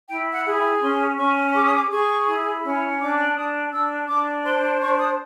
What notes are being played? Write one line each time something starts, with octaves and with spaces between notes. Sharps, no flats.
E4 G5
F#5
G#4
G5
C#4 C6
C#4 C#6
G#4 D6
D#6
D6
G#4 C#6
E4
C#4
D4 D6
D4 D#6
D4 E6
D4 D6
C5 C6
C6
D4 C#6
D#6